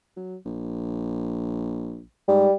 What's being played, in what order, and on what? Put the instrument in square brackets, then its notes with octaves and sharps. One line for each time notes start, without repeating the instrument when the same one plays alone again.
[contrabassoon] F#3
A#1
[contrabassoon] G#2 [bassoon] G3